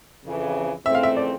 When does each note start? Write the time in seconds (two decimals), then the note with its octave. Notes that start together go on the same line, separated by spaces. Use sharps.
0.24 F2 C#3 E3
0.85 F2 C#3 E3 A3 C4 E5
0.95 F5
1.03 E5
1.17 D5